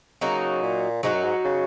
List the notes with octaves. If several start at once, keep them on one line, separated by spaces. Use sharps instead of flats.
C#3 F#3 A#3 D#4 F#4
A#2
G#2 F#3 D#4 F#4
F#2
G#2
C#3